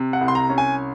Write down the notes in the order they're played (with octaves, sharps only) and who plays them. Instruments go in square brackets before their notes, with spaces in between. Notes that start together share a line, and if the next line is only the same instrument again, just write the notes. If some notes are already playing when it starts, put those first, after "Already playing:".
Already playing: [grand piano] C3
F#5
C2
C6
A#5
C#4
G#5